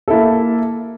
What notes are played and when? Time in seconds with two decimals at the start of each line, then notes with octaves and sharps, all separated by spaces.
0.08 A4
0.10 E4
0.13 A#3